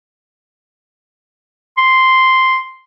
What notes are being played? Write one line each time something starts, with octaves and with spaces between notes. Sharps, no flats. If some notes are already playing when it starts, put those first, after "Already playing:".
C6